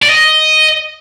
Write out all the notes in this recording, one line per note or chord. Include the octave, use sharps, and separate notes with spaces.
D5
D#5